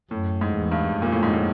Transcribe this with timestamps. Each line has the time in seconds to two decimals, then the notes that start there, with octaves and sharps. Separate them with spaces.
0.11 F#2 A2
0.41 G#2
0.56 E2
0.71 G2
1.01 F2 A#2
1.12 A2
1.23 G#2
1.34 A2